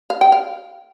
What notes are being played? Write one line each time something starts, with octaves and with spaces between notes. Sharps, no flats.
F5
G5
F5